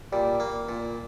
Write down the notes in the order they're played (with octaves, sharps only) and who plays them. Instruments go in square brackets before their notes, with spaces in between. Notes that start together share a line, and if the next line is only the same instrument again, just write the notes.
[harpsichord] A#2 [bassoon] G3
[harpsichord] A#3
A#2